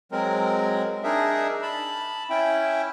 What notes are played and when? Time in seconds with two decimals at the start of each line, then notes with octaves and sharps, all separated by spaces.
0.12 F#3 G#3 C4 A#4
1.03 D4 D#4 G#4 A#4 E5
1.62 A5 B5
2.30 C#4 E4 E5 G5